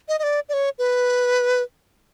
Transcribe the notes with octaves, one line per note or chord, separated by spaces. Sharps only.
D#5
D#5
D5
D5
C#5
B4